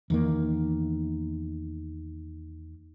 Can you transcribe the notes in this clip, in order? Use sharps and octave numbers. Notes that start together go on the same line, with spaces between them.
E2 D#3 A#3